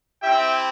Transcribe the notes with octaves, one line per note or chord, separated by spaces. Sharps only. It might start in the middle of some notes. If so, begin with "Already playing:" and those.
C4 E4 G4 E5 G5